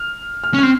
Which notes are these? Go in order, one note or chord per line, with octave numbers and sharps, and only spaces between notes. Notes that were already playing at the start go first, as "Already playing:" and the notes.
Already playing: F6
F6
C#4
C4 F6